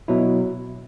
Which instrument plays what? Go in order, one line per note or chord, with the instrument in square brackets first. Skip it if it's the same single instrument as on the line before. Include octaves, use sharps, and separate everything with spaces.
[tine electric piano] B2 F#3 E4